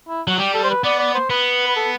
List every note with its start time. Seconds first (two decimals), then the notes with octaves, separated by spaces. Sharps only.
0.08 E4
0.27 F#3 F#4
0.38 G3 G4
0.54 A4
0.64 C5
0.70 B4
0.84 B3 D5
0.99 D5
1.15 C5
1.30 B3 B4
1.67 B4
1.76 A4